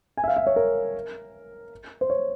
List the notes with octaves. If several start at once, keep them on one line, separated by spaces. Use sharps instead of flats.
G#5
E5
F5
E5
C#5
A#4
C5
C#5